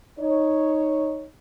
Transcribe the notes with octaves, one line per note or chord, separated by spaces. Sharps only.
D#4 C#5